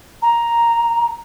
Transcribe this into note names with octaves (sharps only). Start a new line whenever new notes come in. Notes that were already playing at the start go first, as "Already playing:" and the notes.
A#5